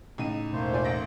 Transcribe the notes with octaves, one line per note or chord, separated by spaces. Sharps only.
C#2 A2 C#4 D#4 D#7
E1 A3 A#3 C5
F4 D5 G#5
A1 A#6 D7